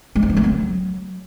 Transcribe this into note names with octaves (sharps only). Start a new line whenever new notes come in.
G#3
C4
E3
A3
F#3